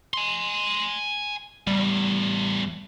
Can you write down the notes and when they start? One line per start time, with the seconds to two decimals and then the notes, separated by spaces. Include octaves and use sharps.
0.14 G#5 C6
1.67 E2 A2 G3